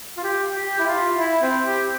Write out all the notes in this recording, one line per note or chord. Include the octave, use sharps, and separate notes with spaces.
F4
G4
G4
E4
F4
E4
C4
G4